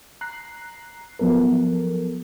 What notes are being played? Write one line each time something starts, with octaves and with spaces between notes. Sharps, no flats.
A#5 F#6 C7
F3 F#3 B3 A4 A#4